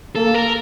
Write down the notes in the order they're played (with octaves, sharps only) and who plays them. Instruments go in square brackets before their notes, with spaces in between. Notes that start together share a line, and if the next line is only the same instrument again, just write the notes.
[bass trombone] A#3 [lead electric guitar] A4
[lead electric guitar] A#4